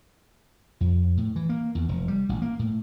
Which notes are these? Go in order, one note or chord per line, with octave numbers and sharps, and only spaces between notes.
F2
A2
E3
A#3
E2
F1
G3
A1
A#3
A2